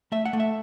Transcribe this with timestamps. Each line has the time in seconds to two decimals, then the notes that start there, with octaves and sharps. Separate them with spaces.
0.12 A3 E5
0.25 F#5
0.33 A3
0.40 E5